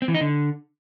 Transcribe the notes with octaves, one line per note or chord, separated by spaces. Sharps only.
C4
E3
D#4
D3